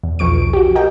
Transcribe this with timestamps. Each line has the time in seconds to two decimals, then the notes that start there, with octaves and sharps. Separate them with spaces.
0.04 E2
0.19 B1 F2 F3 C#6 D7
0.53 F#4 G4
0.75 F#4 G4 A#4 D#5 G5